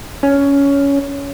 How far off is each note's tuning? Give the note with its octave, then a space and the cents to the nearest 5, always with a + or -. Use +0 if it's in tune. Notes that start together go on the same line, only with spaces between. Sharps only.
C#4 +15